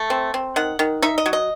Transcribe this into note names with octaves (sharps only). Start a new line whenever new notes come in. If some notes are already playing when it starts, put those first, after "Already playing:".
Already playing: A3
C4
C4
D#3 F#5
D#3
D#4 E5
D#5
F#3
D#5